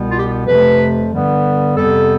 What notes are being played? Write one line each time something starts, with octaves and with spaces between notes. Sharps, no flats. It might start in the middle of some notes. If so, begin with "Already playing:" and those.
Already playing: C2 B2 G3 B3
F4
G4
F2 C3 F3 A3 B4
G2 D3 G3 B3
F2 C3 G3 B3 A4